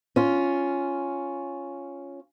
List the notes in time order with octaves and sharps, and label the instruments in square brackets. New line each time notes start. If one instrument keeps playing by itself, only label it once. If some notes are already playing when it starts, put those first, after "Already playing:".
[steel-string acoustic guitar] C#4 F4